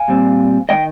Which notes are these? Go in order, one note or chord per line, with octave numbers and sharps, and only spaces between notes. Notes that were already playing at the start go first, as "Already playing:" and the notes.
Already playing: F5 G#5
A#2 G3 C4
D#3 G#3 C4 D#5 G5